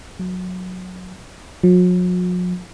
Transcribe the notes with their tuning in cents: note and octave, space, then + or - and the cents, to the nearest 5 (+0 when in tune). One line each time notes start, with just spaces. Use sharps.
F#3 -15
F#3 -45